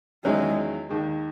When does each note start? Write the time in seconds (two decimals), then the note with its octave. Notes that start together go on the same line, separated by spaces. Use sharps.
0.24 E2 D#3 F#3 G#3 C#4 E4
0.89 D#2 D#3 G#3